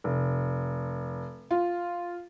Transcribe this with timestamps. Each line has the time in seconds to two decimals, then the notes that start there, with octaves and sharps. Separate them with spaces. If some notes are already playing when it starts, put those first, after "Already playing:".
0.04 F1
1.51 F4